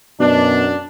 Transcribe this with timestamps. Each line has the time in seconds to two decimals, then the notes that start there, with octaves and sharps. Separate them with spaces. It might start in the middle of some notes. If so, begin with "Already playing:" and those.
0.20 F#2 B2 D4